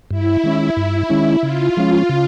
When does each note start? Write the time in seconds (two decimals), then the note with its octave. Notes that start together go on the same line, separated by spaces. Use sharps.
0.11 G2 E4
0.44 D#3 G#3 C#4
0.77 G2
1.10 D#3 G#3 C#4
1.43 C#3 F4
1.77 F3 G#3 C#4
2.09 C#3